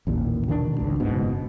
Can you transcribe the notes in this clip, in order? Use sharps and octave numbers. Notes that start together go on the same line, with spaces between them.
A1 D#2 A#2
B2 D#3 C4 D4
G#1 C#2 D4
F#1 G#2 B2